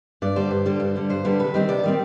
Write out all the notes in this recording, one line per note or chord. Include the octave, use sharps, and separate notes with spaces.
G2 D5
D3 G3 C5
G2
D3 G3
G2
D3 G3
G2 C5
D3 G3 B4
C3 B4
D#3 G3 C4
C3 D5
D#3 G3 C4